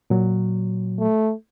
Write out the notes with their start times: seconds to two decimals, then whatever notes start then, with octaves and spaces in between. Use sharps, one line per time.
0.10 A#2 F#3
0.99 A3